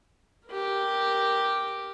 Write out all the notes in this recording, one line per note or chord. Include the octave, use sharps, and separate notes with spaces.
G4 A#4